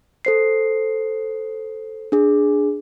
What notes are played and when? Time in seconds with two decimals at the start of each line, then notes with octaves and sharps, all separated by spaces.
0.25 A4 C5 C7
2.12 D4 G#4